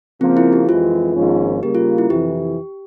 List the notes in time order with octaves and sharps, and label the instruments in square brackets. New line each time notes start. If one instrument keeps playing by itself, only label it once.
[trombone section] C#3 F3 A#3 [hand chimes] C4
[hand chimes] E4
G4
[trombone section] F2 E3 G#3 C4 [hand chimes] F4
[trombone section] G#1 G#2 F3 A#3 C#4
[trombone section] C#3 G3 A#3 [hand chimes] G4
[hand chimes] F4
E4
[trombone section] F2 C3 E3 [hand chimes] G4